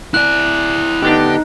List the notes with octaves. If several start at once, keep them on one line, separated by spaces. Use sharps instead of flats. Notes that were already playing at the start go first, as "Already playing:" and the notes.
E4 D5 F#6
D3 B3 D4 D#4 G4